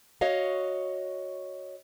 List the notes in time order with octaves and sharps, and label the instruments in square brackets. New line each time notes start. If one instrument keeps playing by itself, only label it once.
[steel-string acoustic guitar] F#4 C#5 D#5 F5